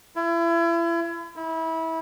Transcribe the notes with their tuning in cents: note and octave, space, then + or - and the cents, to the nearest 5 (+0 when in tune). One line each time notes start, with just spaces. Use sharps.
E4 +35
E4 -25